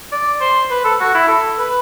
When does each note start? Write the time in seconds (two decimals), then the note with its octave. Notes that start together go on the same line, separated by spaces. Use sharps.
0.12 D5
0.41 C5
0.70 B4
0.85 A4
1.00 F#4
1.15 E4
1.28 A4
1.58 B4